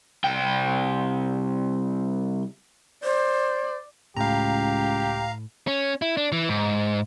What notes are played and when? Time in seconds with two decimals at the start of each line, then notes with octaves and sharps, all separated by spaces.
0.24 C2 G5
3.04 C5 D5
4.17 C#2 A2 G4 F5 A#5
5.67 C#4
6.02 E4
6.17 D4
6.32 E3
6.49 G#2